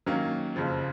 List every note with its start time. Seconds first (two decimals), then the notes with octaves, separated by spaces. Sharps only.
0.06 D#3 F#3 A#3 C#4
0.56 F#1 F2 C#3 F3